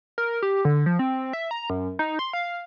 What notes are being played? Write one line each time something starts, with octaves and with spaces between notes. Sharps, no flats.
A#4
G4
D3
F3
C4
E5
A#5
F#2
D#4
C6
F5